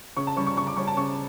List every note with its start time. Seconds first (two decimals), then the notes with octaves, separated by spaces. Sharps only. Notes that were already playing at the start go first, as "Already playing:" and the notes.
0.17 C#3 C#6
0.27 A5
0.36 G3 C#4 C#6
0.47 C#6
0.57 C#3 C#6
0.67 D6
0.77 G3 C#4 C#6
0.87 A5
0.97 C#3 C#6